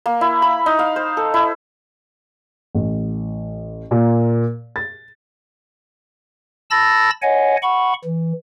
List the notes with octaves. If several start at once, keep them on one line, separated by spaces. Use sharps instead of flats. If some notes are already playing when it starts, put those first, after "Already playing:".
A#3
E4
B5
D#4
F5
C5
A4
E4
A1
A#2
A6
A5 B5 E6 A6 A#6
C#5 D#5 F#5 G#5
F#5 B5 C#6
E3